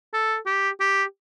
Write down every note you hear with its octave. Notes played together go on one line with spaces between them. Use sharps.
A4
G4
G4